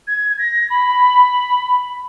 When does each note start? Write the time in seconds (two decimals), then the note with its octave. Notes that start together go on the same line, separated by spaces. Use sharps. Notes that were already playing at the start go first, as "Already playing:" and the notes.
0.07 G#6
0.30 G#6
0.39 A#6
0.70 B5